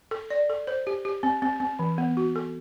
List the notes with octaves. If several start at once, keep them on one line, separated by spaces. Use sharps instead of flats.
A4
D5
A4
C5
G4
G4
C4
C4
C4
E3
B3
F#4
A4